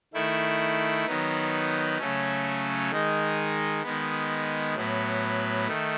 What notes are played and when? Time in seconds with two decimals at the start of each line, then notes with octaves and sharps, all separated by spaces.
0.14 D#3 A3 E4
1.06 D#3 F#3 B3 D#4
1.98 C#3 F#3 A3 C#4
2.90 D#3 G#3 D#4
3.83 D#3 G#3 B3
4.75 A2 F#3 B3
5.67 D#3 A3